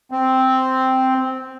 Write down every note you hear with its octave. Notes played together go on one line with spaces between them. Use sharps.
C4